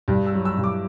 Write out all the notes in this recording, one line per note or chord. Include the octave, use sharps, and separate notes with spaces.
G2
E6
F#3
E6
G2
D6